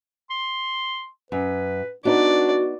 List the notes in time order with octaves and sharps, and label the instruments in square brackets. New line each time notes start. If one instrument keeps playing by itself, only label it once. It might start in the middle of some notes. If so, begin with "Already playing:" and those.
[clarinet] C6
[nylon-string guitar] F#2 [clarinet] B4
[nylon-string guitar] B3 D#4 [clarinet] D4 [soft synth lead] F#4 [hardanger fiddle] D5